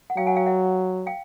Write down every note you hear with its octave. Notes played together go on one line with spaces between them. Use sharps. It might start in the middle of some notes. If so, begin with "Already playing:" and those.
F#5
F#3 F5 G5
F#5 G#5
F5 G5
E5 F#5
F5 G5